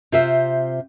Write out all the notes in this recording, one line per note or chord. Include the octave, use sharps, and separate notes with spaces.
C3 F4 C5 E5